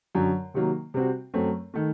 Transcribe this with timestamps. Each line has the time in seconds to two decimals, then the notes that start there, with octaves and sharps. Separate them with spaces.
0.15 F#2 D3 F#3
0.54 C3 D#3 F#3 A#3
0.94 C3 G3 C4 F#4
1.34 F#2 F#3 A3 C4
1.74 D#3 A3